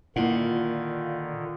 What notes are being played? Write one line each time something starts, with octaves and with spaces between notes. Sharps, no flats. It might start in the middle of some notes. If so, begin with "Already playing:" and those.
A#2 D3 D#3 A#3 E4 F4 F#5